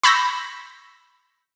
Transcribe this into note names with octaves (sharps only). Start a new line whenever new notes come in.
B5 C#6 E6 G6 A#6 B6